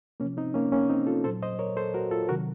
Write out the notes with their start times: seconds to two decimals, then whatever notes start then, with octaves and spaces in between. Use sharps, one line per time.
0.20 C3 F3 A#3 C#4
0.37 C4 D#4
0.54 A#3 C#4
0.72 A#3 C#4
0.90 C4 D#4
1.07 F4 A4
1.24 A#2 F#3 A4 C5
1.43 C5 D#5
1.59 A#4 C#5
1.77 A4 C5
1.94 F#4 A#4
2.11 F4 A4
2.28 C3 D#3 F#3 F#4 A#4